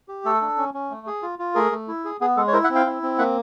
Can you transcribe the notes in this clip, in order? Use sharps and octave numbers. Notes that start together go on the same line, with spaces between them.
G4
A3 A4
D4
C#4
C#4
A3
G#4
F4
F4
A3 G#4 A#4
A3
E4
G#4
B3 G#4
G#3 A4
C#5
E4 A#4 C5
E5 F#5
C4
F5 G5
E4
C4
A#3 E5 F#5